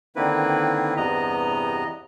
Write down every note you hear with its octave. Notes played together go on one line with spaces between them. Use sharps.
D3 D#3 A#3 C4 E4 B4
E2 G2 C3 B3 D#5 A#5